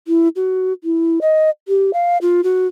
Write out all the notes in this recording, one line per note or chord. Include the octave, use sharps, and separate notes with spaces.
E4
F#4
E4
D#5
G4
F5
F4
F#4